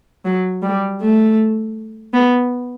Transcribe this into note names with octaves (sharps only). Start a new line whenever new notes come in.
F#3
G3
A3
B3